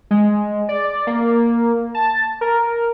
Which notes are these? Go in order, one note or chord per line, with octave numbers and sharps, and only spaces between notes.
G#3
D5
A#3
A5
A#4